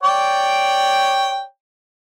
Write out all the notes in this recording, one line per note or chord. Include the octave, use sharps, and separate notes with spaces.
C#5 D5 G5